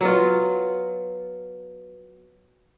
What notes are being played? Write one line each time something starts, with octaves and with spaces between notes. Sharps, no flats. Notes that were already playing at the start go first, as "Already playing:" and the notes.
F#3 B3 F4